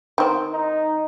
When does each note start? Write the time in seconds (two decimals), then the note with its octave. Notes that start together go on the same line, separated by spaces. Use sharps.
0.18 D#3 C4
0.52 D#4